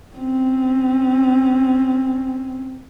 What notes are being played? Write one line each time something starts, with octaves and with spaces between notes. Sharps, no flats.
C4 C#4